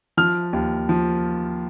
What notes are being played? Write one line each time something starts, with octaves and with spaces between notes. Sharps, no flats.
F3 F6
D#2
F3